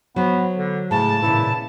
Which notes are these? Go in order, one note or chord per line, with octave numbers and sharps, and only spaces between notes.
F#3 B3 C5
D3
A2 C#3 A5
A#2 C#3 E3 E4